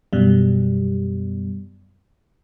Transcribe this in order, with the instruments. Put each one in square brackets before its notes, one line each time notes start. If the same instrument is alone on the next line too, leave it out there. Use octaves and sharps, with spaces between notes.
[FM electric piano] F#2 B2 G3